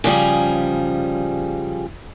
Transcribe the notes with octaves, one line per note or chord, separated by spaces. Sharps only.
C#3 F3 G3 G#4